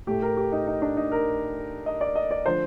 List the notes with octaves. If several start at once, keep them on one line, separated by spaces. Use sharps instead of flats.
A2 A3 G4
A#4
G4
D#4
D#4
D4
D#4
A#4
D#5
D5
D#5
D5
D3 F3 A3 C5